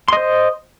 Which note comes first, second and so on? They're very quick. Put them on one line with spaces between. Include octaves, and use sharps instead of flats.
C6 D#5 C5